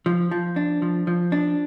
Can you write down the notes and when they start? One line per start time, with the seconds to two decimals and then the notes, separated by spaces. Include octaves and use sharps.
0.06 F3
0.31 F3
0.56 D4
0.82 F3
1.07 F3
1.32 D4